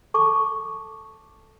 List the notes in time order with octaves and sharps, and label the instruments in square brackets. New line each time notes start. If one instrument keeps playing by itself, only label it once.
[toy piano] A4 A5 C#6 D6